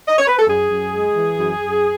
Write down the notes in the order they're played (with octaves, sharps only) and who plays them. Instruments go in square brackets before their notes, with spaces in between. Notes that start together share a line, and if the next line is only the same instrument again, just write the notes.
[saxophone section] D#5
C#5
B4
A4
F#2 G#4
F#2
G#3
E3
F#2
F#2